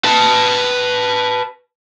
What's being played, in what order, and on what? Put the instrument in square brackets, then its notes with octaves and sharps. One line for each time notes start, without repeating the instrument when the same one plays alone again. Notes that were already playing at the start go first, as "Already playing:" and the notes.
[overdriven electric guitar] B4 A5